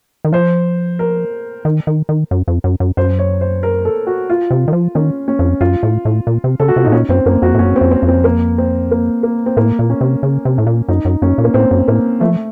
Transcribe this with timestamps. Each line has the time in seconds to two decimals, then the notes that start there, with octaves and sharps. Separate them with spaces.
0.25 D#3
0.33 F3 C5
0.99 A#4
1.65 D#3
1.87 D#3
2.09 D#3
2.31 F#2
2.48 F2
2.64 F#2
2.80 F#2
2.97 F#2 C5
3.19 C#5
3.41 C5
3.63 A#4
3.85 A4
4.07 F#4
4.30 F4
4.51 C3
4.68 D#3
4.73 F3
4.95 D#3 C#4
5.28 C#4
5.39 F2
5.61 F#2 F4
5.83 A2
6.05 A2
6.27 A#2
6.44 C3
6.60 C#3 A4
6.68 F#4
6.76 C3 F4
6.84 A2 D#4
6.92 A#2 C#4
7.09 F#2 C4
7.26 F#2 A#3
7.42 F2 F#4
7.54 A2
7.59 F#2 C#4
7.76 C4
7.81 F2
7.91 C4
8.03 F2
8.08 C4
8.24 A#3
8.58 C4
8.91 A#3
9.23 A#3
9.46 C4
9.57 A2 A#3
9.79 A#2
9.90 C#4
10.01 C3
10.23 C#3
10.45 C3
10.58 A2
10.67 A#2
10.88 F#2 D#4
11.05 F#2
11.22 F#2 C#4
11.38 A#2
11.44 A#3
11.54 A2 C4
11.71 F#2
11.88 A2 A#3
12.20 F3 A3